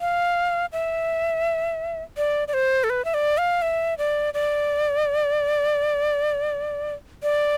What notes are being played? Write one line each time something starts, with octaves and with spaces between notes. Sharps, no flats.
F5
E5
D5
D5
C5
A4
B4
E5
D5
F5
E5
D5
D5
D5